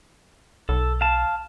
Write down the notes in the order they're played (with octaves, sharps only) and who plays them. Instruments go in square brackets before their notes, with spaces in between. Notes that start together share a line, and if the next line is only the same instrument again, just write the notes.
[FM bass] B1 [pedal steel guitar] A4
[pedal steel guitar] F5 A5